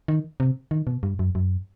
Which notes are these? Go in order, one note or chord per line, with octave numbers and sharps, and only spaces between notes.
D#3
C3
D#3
B2
G2
F#2
F#2